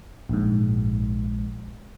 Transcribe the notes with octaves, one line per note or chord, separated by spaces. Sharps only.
A#1 G#2